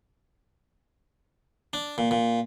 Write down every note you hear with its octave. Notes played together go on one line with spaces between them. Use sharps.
D4
A#2
A#2